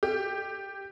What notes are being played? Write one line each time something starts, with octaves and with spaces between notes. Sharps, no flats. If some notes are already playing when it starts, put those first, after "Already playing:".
G4